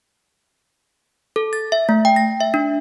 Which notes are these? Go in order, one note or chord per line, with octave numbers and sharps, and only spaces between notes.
A4
A6
E5
A3
G5
A#6
E5
D4